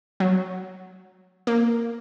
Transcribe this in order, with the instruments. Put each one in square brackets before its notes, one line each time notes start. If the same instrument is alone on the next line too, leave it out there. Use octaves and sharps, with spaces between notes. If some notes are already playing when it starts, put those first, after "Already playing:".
[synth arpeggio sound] F#3
A#3